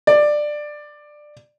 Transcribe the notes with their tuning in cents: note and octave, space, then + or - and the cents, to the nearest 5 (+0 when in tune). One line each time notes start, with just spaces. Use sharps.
D5 +15